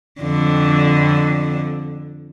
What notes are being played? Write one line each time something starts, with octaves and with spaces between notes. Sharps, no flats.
F2 D3